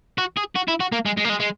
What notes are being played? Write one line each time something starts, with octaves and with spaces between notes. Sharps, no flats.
F#4
G#4
F#4
E4
F#4
A#3
G#3
G#3
A#3
G#3
G#3